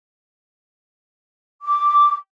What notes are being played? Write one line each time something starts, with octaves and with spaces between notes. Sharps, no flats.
D6